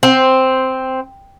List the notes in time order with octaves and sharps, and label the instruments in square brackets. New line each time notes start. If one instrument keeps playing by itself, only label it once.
[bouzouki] C4